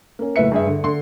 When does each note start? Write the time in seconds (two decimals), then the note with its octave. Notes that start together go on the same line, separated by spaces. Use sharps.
0.19 A#3 C#4
0.36 F#1 A2 B4 E5 C#7
0.52 G2 G#4 E5
0.67 D3
0.84 D3 C6